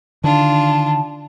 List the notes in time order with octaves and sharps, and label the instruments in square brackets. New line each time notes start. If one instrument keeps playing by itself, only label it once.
[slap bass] D3 D#3 [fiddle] D4 F4 [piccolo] A5